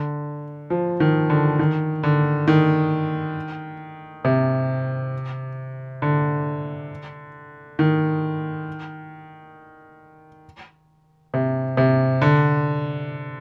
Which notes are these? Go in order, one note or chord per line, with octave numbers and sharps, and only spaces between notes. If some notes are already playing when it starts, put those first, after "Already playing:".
Already playing: D3
F3
D#3
D3
D#3
D3
D#3
C3
D3
D#3
C3
C3
D3